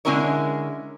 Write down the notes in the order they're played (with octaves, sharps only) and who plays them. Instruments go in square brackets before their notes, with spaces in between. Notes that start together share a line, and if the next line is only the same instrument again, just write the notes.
[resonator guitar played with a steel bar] D3 G#3 C#4 E4 A#4 C#5